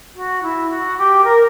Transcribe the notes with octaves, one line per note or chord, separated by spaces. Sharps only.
F#4
E4
F#4
G4
A#4